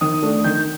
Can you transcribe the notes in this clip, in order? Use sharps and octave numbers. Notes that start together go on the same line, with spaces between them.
D#3 D#6
A3 D4
D#3 G6